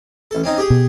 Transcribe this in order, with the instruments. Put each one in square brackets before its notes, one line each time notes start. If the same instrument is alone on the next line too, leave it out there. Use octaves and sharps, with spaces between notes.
[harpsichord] A1 A4
C4 C#4 D#4
G4 G#4
[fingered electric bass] B2